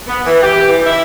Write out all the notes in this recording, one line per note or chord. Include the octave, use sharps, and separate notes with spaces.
B3
E3
G4
E3
E4